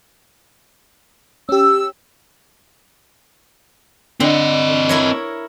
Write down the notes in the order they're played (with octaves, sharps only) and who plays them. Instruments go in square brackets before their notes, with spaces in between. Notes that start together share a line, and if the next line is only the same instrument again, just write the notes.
[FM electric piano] C#4 G4 [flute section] E6
[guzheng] D3 [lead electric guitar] C4 D#5
[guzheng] E4 A#4 C#5